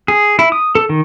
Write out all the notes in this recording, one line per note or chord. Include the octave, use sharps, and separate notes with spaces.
G#4
E4
D#6
A4
D#3